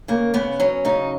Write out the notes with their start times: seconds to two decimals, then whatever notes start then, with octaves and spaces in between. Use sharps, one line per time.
0.08 C#3 A#3
0.34 C#3 B3
0.60 F#3 C#4
0.85 C#3 D#4